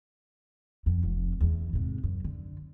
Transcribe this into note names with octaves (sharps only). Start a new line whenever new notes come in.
F2
F1 F3
E2 E3
G#2 C3
F#2
D3